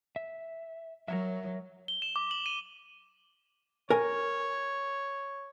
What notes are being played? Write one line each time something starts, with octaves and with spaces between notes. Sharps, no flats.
E5
F#3 A#4 C#5 E5
G7
E7
D6
F#7
D#7
A#4 C#5 G#5